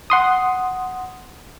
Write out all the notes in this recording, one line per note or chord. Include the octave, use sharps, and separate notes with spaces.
F#5 C6 D#6